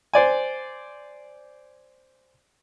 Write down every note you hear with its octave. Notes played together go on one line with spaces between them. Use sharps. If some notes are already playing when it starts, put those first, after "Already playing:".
C5 D5 G#5